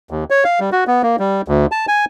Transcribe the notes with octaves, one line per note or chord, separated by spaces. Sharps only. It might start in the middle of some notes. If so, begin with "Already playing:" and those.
D#2
C#5
F5
G3
F#4
B3
A#3
G3
D2
A5
G#5